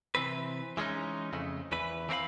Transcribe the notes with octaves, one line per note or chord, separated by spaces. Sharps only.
C3 E3 C4 B4
E3 G#3 A#3 C#4 D#4
F2 C#3 A3
E2 E3 B4
E3 C4 A#4 F5 B5